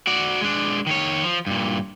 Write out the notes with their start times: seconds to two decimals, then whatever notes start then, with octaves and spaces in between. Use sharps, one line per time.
0.07 F#4 D5
0.41 G#3 D4
0.87 D#3 C#5
1.24 F3
1.47 G2 A#2